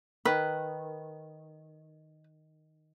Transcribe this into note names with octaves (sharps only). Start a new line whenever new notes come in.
D#3 B4